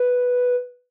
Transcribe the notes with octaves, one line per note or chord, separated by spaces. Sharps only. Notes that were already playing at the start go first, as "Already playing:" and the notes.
Already playing: B4